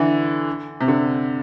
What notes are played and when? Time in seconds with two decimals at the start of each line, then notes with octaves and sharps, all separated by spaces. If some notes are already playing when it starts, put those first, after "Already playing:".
Already playing: D3 E3
0.81 C3
0.88 D3